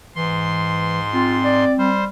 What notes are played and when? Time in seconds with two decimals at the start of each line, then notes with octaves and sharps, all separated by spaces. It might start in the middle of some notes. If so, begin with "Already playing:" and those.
0.15 G#2 E3 C6
1.13 C4 F4
1.44 D5
1.78 G3 C5